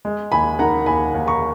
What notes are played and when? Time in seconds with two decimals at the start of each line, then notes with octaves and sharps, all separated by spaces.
0.05 G#3
0.32 D#2 G#5 B5
0.59 D#3 F#5 A#5
0.86 D#2 G#5 B5
1.14 D#2
1.27 A#5 C#6